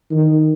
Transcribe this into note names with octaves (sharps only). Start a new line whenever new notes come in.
D#3